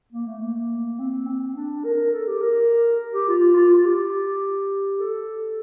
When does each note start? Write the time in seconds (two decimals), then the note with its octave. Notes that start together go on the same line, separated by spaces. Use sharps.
0.13 A#3
0.27 A3
0.41 A#3
0.99 C4
1.28 C4
1.56 D4
1.85 A#4
2.13 A4
2.27 G4
2.41 A#4
3.14 G4
3.28 F4
3.56 F4
3.76 F4
3.85 G4
5.00 A4